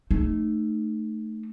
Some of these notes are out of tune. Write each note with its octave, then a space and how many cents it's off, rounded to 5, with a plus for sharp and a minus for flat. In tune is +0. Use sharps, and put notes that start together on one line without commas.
A3 +0 D#4 -20